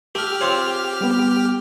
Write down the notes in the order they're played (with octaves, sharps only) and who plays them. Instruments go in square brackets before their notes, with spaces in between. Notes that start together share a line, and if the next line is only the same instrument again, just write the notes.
[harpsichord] A3 [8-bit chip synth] G4 F6
[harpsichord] C4 F4 C#5
[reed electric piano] G3 B3